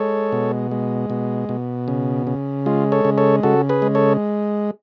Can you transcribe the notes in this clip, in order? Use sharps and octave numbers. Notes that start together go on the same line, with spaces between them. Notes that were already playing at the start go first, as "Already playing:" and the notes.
Already playing: G#3 A4 C#5
B2
G#3
B2
B2
C#3
C#3
G#3 F4
A4 C#5
C#3
A4 C#5
C#3 F#4 A4
G#4 B4
G#3
A4 C#5